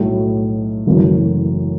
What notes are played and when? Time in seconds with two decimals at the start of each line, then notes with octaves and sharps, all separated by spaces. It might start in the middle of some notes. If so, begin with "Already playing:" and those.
Already playing: B1 A2 F#3 A3
0.87 F#1 F#2 E3 A3 F#4